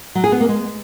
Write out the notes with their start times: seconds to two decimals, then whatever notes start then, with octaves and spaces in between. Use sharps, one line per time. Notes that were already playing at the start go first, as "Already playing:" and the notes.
0.15 F#3
0.24 G#4
0.32 B3
0.40 A#3
0.49 G#3